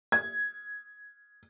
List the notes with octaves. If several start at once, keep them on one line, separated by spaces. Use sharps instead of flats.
G#6